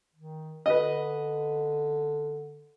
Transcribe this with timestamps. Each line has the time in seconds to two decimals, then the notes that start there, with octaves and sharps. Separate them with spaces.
0.15 D#3
0.66 D3 B4 D#5